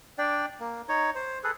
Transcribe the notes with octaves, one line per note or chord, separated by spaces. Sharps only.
D4 D5 G5
A#3
D#4 C#5
C5
G#4 A4 B4